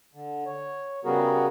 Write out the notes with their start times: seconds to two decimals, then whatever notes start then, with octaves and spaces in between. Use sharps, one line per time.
0.14 D3
0.46 C#5
1.05 C#3 G3 B3 F#4 G#4 A#4